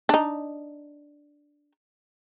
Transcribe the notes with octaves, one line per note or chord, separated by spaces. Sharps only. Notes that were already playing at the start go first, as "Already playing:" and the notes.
D4 D#4